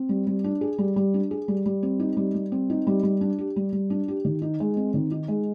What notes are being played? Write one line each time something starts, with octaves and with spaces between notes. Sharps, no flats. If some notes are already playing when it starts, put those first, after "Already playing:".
Already playing: C4
G3
G3
D4
G#4
G3
G3
D4
G#4
G3
G3
C4
D#4
G3
G3
C4
D#4
G3
G3
D4
G4
G3
G3
D4
G4
D#3
D#4
G#3
C4
D#3
D#4
G#3